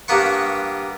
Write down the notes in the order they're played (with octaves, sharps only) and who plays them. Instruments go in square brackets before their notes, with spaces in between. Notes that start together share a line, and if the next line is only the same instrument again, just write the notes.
[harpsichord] G2 A#3 B3 C#6